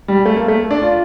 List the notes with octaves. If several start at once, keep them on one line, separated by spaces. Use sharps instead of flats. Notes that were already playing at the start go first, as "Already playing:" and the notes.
G3
A3
A#3
A3
D4
F4